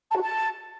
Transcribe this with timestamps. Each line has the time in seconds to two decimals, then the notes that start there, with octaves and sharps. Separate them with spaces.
0.10 A5
0.15 F#4
0.21 A5